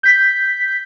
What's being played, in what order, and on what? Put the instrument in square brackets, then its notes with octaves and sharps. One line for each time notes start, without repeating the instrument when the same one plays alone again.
[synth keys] G6 B6